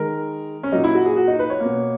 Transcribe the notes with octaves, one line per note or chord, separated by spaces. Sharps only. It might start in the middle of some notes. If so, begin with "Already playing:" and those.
Already playing: D#3 G#3 A#4
C#4
A#2 F#3 A#3 D#4
E4
F#4
G#4
F#4
D#4
B4
C#5
B2 A#3